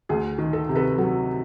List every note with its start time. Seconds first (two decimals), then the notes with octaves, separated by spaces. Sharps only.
0.09 D2 G#4
0.38 D#3
0.53 A4
0.69 C3
0.75 A4 B4
0.98 F#3 A4